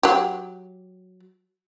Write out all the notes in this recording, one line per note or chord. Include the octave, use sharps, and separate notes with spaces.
F#3 G4